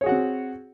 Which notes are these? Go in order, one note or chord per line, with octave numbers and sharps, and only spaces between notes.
C4 F#4 G#4 C#5 F#5